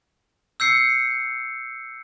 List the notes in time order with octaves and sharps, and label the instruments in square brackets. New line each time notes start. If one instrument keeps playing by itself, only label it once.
[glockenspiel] E6 G6 C7 C#7